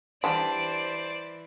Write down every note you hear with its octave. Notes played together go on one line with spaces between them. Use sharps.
E3 G3 D4 C5 D5